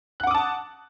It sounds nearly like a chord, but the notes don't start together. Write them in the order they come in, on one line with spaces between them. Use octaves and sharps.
F#6 F#5 D6 D#6 A5